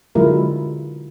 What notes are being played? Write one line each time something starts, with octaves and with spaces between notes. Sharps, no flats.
D3 F#3 G#3 E4 F4 A#4